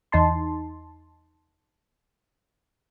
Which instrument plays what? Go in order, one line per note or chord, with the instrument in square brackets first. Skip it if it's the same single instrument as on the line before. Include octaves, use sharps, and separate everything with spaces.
[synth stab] E2 D#4 A5 C6